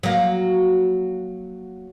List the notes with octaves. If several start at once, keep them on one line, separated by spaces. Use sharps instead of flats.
F#3 A#3